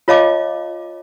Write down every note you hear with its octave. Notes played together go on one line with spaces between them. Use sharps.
F4 C#5 D#5 F5 A5 D6